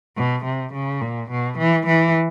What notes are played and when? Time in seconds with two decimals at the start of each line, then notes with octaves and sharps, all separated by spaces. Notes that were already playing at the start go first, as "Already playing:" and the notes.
0.17 B2
0.45 C3
0.73 C#3
1.01 A#2
1.30 B2
1.58 E3
1.87 E3